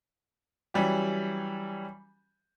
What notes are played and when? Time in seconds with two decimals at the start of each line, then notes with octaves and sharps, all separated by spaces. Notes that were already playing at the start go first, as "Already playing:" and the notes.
0.74 E3 F#3 G3 C#4 G4